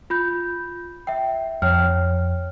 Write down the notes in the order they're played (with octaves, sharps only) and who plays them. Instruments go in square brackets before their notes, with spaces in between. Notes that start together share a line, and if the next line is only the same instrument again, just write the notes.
[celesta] F4 B5 G6
E5 G5
[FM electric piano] F2 [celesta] C#5 G5 F6